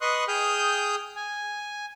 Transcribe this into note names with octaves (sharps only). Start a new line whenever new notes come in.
B4 D#5 C6 C#6 D#6 F#6
G#4 G5 D#6 F6 G6
G#5